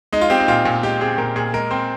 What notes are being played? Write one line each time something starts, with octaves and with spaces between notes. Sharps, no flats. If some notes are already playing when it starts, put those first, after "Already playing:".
G#3 D#4
F4
C4 G4
D#4
A#2 F4
A#2
G#3 G4
C4 G#4
A#2 A#4
A#2 G#4
G#3 A#4
C4 C5